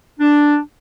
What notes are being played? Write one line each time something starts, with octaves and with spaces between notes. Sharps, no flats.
D4